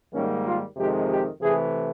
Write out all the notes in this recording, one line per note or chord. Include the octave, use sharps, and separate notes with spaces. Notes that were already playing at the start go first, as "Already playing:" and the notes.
G#2 D#3 G3 A#3 C#4
F4
F2 C3 D#3 G#3 G4
G4
C3 E3 A3 G#4